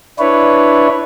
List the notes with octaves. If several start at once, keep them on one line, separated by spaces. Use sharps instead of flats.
D4 E4 B4 C#5